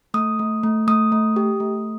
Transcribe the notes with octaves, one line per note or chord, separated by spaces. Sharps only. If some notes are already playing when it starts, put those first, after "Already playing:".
A3 D#6
A3
A3
A3 D#6
A3
G4
A3